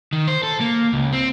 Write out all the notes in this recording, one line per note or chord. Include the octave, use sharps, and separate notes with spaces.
D#3
C5
A4
A#3
C#2
C4